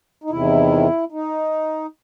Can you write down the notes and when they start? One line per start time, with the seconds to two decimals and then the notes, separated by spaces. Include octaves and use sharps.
0.24 D#4
0.30 E2 C3 D#3 E4
1.12 D#4